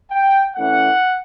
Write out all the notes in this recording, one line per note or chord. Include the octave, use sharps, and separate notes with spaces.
G5
E3 A3 C#4 F#5